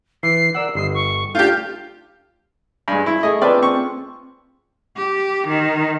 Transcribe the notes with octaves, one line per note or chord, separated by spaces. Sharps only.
E3 C7
A#4 D5 F#5 E6
G1 D#5 C7
C#6
A3 D4 F4 G4 G6
G2 G#3
E4
A3 G#4 D#5
C4 D4 F4 B4 D5
C4 C#6
G4
D#3